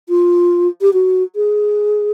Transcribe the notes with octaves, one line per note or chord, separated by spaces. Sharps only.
F4
G4
F#4
G#4